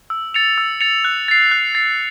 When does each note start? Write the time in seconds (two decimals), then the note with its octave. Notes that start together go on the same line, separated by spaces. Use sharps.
0.10 E6
0.34 A6 C#7 F7
0.58 E6
0.81 A6 C#7 F7
1.05 F#6
1.28 A6 C7
1.51 F#6
1.75 A6 C7